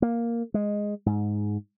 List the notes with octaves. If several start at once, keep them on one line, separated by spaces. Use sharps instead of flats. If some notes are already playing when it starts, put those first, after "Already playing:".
A#3
G#3
G#2